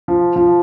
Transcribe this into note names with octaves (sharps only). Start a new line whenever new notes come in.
F3
F3